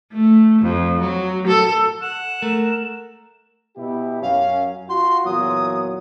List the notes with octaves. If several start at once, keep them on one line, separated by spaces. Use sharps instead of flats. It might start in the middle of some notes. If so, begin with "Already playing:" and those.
A3
F2
F#3
A4
F#5 E7
A3 A#4
B2 E4 G4
F#2 C#4 F5
F4 F#4 C6
E2 A#2 F#3 D#6